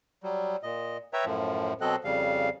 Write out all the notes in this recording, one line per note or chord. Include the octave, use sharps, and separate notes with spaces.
F#3 G3
A#2 D#5
B4 C#5 E5 G5 A#5
F#2 A2 F3
B2 F#3 C4 A4 D#5 F#6
F2 C#3 G3 F5